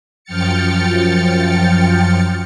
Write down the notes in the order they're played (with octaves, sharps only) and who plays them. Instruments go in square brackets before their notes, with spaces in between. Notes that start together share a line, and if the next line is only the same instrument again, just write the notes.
[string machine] F#2 F3 G5 F6 A6 C#7